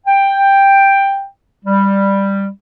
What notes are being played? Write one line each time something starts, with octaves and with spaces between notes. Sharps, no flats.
G5
G3